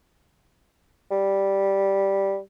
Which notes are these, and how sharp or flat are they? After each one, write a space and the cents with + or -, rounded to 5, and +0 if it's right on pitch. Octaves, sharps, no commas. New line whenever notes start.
G3 -5